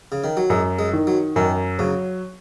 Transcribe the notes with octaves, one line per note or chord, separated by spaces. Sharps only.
C#3
D#3
F#3
F#2 G#3
G#3
D#3
F#3
F#2 D#3
C#3 F#3